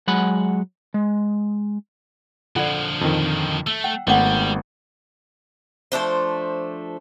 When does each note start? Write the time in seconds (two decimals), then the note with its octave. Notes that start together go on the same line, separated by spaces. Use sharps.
0.07 F#3 G#3 F#5 B5
0.94 G#3
2.56 D3 F3 F4 A4 D5 F#5
3.01 F2 D#3
3.67 A3 E6
3.84 F#5 G5
4.07 G#1 G3 A3 B3 C#4 F#5 G5
5.92 F3 A3 D4 C5